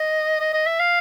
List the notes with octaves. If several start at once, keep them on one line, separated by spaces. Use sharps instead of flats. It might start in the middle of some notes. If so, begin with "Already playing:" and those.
Already playing: D#5
D#5
D#5
E5
F5